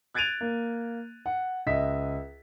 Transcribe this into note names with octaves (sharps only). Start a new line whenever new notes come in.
F#6 G#6 A6 D7 D#7 F7
A#3
F#5
C#2 D#5 E5 B6